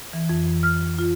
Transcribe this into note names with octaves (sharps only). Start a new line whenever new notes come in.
E3
F2
E3
F6
F4